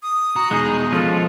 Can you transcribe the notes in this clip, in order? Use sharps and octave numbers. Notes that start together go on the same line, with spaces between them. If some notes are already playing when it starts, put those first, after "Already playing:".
D#6
F#4 A#5
E2 B2 G#3 D#4 G#4
F3 G#3 C#4 F4 A4